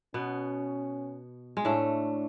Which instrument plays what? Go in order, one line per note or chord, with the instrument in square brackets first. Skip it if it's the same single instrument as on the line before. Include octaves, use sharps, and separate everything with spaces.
[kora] B2 B3 [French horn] C#4
[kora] G#3
[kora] A2 A3 [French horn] D4